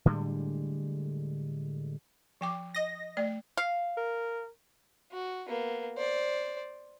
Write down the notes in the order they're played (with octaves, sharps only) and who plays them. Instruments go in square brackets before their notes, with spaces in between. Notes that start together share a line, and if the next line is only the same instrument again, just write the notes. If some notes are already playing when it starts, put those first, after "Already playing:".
[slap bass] A2 D3 G3 G#3
[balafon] F3 G5 D6
[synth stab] D#5 A#6
[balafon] A3 D5
[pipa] F5
[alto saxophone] A#4
[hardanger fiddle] F#4
A#3 B3
C5 D5